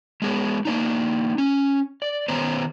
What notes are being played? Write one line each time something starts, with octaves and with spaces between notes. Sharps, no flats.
G#3 B3 G#4 C#5
A#3 D4 D#4
C#4
D5
D#3 B3 C5 C#5 A#5